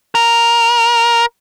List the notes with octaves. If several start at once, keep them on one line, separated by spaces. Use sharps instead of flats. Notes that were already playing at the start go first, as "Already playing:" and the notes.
A#4